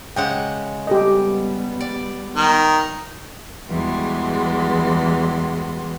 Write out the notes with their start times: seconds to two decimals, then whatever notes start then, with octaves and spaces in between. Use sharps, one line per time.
0.16 C#3 G#3 F#5 G5
0.87 G3 B3 G4 A4 D#5
1.80 D5
2.36 D#3
3.68 E2 E3 G3 G#3 F#4 C6